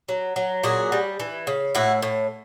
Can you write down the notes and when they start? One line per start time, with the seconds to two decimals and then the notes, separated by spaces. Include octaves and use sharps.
0.09 F#3
0.36 F#3
0.63 A#2 F#4 G#4
0.92 G3
1.20 E3
1.47 C#3
1.75 A2 E4 F#4
2.02 A2